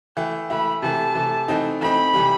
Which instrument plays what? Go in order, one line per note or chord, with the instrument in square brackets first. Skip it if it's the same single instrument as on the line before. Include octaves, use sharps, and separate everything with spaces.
[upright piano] E3 A3 E4 [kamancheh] G5
[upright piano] E3 A3 E4 [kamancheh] B5
[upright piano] C3 E3 A3 [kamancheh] A5
[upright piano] C3 E3 A3
E3 A3 C4 D#4
[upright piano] E3 A3 C4 D#4 [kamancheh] B5
[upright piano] C3 E3 G3